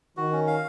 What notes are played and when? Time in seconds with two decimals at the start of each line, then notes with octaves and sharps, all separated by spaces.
0.17 D#3 F#4
0.32 C#4
0.47 F5